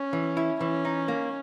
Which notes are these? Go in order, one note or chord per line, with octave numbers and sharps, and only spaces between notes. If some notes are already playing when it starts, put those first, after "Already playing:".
Already playing: C#4
E3
E4
E3 C#4
D#4
A#3